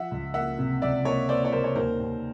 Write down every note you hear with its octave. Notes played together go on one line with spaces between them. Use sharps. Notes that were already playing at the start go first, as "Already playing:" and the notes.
Already playing: F3 E5 F#5
C#2
A#3 E5 F#5
C3
C#2 D5 E5
A#3 C#5 D#5
A#3 C5 D5
C#5
C#2 A#4 C5
C#5
D#2 A#4 C5
D#2